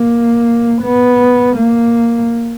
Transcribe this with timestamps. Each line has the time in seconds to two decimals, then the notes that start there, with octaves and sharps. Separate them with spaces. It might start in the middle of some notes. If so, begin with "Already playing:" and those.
Already playing: A#3
0.82 B3
1.56 A#3